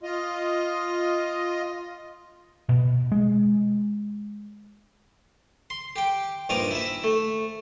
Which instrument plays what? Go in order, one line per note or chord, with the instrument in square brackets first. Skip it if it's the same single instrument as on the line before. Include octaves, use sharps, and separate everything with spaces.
[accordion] F4 D#5
[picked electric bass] B2
G#3
[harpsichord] C6
G4 G5
A#1 G2 F3 D#4 G#5 D6
E4 E5
A3